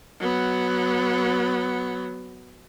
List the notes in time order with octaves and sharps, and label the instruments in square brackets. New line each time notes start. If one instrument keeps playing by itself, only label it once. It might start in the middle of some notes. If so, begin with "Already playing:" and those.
[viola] F#3 B3